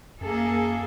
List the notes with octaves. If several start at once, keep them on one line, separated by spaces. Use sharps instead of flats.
F#2 A#3 G#4 A4